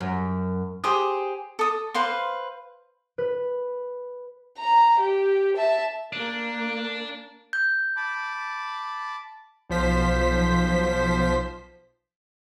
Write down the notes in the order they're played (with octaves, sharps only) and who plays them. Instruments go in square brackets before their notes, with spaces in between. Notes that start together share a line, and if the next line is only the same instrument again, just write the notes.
[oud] F#2
[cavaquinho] G4 G#4 C5 D#6
A4 D#6
B4 C5 F5 C6
[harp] B4
[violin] A#5
G4
E5 A5
[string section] A#3 A#4 [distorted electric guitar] D4
[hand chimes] G6
[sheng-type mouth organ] A5 B5 D6
[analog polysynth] B1 F3 C5 B6